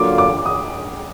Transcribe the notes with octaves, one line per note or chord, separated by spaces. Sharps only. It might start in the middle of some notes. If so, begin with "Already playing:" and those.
Already playing: D3 F#3 A#3 F4 D6
D6
D#6